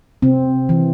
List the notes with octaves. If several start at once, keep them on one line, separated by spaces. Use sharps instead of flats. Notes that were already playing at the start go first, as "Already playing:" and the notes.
C3 C4
E3